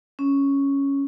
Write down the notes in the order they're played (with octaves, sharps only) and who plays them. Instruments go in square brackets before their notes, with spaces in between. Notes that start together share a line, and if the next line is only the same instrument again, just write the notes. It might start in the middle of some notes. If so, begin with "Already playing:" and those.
[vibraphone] C#4